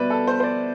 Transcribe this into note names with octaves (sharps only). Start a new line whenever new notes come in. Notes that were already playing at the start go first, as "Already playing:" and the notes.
Already playing: B2 G3 B4 D5 E5
A4
C5
C5
D5